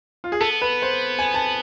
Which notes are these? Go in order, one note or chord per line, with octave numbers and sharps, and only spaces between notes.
F4
G#4
B3 A4
B4
C5
G#5
A5